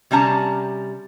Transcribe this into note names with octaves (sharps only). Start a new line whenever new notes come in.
C3 G3 C#4 A5 A#5